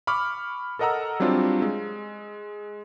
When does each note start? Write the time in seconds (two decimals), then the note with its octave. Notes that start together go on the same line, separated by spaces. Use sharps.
0.07 B5 C#6 D6 F6
0.79 A4 A#4 D#5 F#5 A#5 E6
1.20 F#3 G3 C4 D4 F4
1.62 G#3